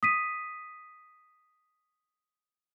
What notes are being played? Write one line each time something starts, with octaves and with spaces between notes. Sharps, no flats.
D#6 B6 D#7